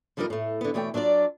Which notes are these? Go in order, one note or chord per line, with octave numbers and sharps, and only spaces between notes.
D3 F3 G3 B3 D#4 A#4
A2 A3
D3 B3
B2 E3 A3 C#5 G5
F#3 D4 F4 C5 D5